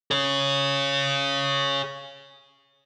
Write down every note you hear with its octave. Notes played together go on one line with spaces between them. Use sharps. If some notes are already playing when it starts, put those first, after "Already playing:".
G#4 C#5